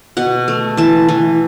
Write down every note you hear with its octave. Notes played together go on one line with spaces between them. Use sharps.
B2 F#5
A3
E3 A5
E3